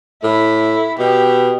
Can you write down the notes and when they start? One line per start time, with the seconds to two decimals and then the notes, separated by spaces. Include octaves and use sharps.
0.24 A2 E4
0.99 B2 G4